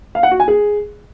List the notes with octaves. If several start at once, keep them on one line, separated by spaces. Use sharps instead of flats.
F5
F#5
F#4
G#5
G#4